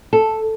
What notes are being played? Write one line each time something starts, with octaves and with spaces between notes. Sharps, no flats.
A4